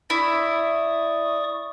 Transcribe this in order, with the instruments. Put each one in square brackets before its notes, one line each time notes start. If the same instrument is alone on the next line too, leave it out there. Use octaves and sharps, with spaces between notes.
[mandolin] E4 [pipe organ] D5 C#6 D#6